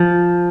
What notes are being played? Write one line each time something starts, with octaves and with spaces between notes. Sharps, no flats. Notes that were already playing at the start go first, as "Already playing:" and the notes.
Already playing: F3